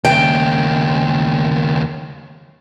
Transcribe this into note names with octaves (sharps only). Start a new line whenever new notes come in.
D#2 C#3 G5